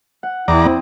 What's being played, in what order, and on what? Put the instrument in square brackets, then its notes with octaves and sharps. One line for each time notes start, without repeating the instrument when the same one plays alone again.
[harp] F#5
[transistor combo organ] E2 D5 A#5 [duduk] E4 [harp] G5 C6 D#6
[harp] C4